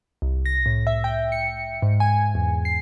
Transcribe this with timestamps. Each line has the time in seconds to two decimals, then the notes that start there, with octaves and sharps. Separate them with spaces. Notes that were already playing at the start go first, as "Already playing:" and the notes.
0.22 C2
0.46 A#6
0.66 A2
0.87 E5
1.04 G5
1.32 C#7
1.82 G#2
2.00 G#5
2.35 E2
2.65 C7